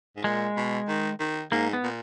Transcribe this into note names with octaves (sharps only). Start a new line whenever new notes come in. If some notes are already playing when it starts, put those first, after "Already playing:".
G#2
A#2 G#3
B2
D#3
D#3
G#2 A#3
B3
A#2